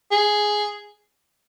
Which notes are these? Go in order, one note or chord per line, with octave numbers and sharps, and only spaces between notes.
G#4